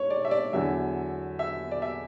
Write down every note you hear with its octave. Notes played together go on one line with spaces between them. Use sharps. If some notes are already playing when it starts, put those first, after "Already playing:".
Already playing: G#2 C#5
D5
E5
D5
E2 D3 F#3 E5
E5
D5
E5